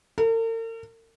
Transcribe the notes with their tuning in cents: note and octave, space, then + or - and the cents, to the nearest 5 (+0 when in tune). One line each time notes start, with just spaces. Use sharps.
A#4 -45